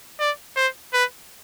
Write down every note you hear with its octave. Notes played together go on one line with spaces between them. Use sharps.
D5
C5
B4